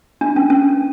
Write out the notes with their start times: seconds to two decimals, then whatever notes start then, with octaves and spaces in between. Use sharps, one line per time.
0.21 D4
0.36 C#4
0.50 C#4